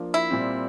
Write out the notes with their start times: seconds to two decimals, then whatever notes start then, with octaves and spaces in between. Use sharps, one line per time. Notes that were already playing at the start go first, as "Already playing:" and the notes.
Already playing: F3 A#3 D4 F4
0.14 E4
0.30 A#2 G3 C4